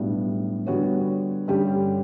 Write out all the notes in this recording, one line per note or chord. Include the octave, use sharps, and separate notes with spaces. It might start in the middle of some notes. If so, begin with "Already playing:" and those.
Already playing: B1 A2 G3 B3 D4
D3 G3 B3 F#4 C#5
G2 D3 G3 C#4 G4